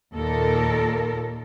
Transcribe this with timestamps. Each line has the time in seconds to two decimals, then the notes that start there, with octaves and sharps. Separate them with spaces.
0.14 D#2 A#2 A4 A#4